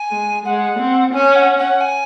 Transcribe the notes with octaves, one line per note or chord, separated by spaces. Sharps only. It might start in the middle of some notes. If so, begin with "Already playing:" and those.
Already playing: G#5
G#3
G#3 F#5
C4
C#4 G#5
F#5
F#5
G#5